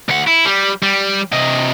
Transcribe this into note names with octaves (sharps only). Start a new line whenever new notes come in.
D2 F#5
E4
G3
G3
C3 D#5